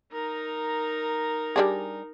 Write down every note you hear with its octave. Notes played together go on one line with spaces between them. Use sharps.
D#4 A#4
G3 D4 G#4